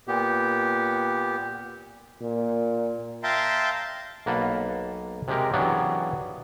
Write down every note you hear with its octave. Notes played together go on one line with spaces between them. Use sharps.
A#2 B3 G4
A#2
E5 F5 G5 A5 A#5 C6
B1 A#3 B4 F#5 A5
C3 G#3 G4 A#4
C#3 E3 F#3 B3 D4 G4